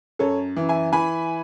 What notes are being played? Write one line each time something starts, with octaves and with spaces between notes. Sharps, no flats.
F#2 A4 C#5
E3
E5 G#5
E3 G#5 B5